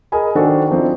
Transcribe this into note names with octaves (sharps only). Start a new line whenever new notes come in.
G#4 A#4 D#5 G#5 B5
D#3 D4 F#4 A4 C5
F3 C4 D4 D#4